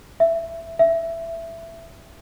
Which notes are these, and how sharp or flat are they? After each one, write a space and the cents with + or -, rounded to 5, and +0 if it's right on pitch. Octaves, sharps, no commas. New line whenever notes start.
E5 +15
E5 +10